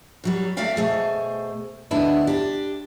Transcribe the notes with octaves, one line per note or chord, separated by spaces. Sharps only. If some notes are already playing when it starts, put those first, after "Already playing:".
F#2 F#3 G3
A3 F#4 D5 E5 F5 G5
B2 A3 G#4 C5
D2 B2 G#3 B3 D4 E4
D4 G4